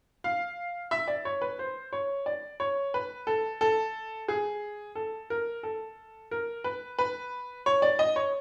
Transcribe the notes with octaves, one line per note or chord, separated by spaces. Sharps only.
F5
E5
D5
C#5
B4
C5
C#5
D5
C#5
B4
A4
A4
G#4
A4
A#4
A4
A#4
B4
B4
C#5
D5
D#5
C#5